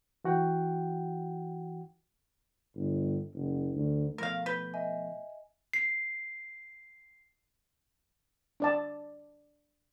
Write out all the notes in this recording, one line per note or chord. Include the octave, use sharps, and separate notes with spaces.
E3 F#4 F#5 G5
G1
F#1
D2
B2 F3 A3 A#4 F5
B4 G6 G7
D#5 E5 G#5
C7
D4 D5 A5